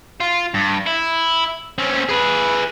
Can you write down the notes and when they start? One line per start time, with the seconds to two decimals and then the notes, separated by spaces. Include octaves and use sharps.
0.21 F4
0.54 G2
0.86 E4
1.78 C4 C#4
2.09 G#4 B4